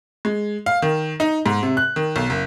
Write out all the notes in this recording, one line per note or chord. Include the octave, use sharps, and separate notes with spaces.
G#3
F5
D#3
D#4
G#2
C3
F#6
D#3
B1
F#1